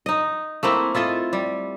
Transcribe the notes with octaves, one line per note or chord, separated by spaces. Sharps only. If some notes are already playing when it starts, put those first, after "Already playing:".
D#4 D#5
A3 A#3 C4 E4
E4 F4 A4 D#5
G3